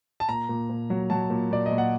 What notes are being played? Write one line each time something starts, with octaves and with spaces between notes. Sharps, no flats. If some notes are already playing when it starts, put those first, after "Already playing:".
A5
A#2 A#5
A#2
A#2
F#3
F#3 A5
A#2
A#2 D5
D#5
A#2
F#5